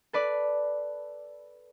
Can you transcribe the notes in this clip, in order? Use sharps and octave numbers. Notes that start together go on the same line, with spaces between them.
A4 B4 D5